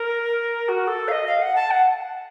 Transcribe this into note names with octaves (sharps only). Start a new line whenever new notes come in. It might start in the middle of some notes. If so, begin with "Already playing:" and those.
Already playing: A#4
F#4
A4
F5
D#5
F5
F#5
A5
F#5